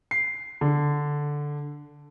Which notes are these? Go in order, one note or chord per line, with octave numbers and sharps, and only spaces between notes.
C7
D3